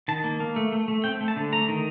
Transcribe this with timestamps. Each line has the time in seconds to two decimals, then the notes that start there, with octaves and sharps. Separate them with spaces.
0.08 D#3 A5
0.24 A#3
0.40 A#3
0.56 A3
0.72 A3
0.88 A3
1.04 C4 G5
1.21 A3
1.28 A5
1.36 D3
1.52 A3 A#5
1.68 D#3